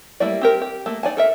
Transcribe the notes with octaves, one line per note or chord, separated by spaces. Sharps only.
G3 A3 A#3 E4 D5
C4 G4 A#4
G4
A3 A#3
D#4 D5 G#5 A5
A4 A#4 E5